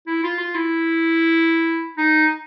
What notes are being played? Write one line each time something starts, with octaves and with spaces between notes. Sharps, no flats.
E4
F4
F4
E4
D#4